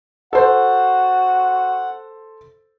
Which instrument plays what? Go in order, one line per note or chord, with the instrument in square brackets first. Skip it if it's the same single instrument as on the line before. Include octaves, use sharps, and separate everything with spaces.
[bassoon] F#4 [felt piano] A4 C5 [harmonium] F#5